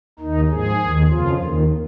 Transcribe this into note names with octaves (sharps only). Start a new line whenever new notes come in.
D#2 D#3 D#4
G#2 F3 G#4
D#2 D#3
F2 C#3 F3 F4
D#2 D#3